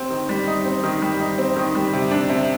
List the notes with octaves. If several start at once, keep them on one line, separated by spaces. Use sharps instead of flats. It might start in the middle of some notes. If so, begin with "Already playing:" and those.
Already playing: C4
D#3
G3
D#4
C4
D#3
G3
D#4
C4
D#3
G3
C3
D4
C3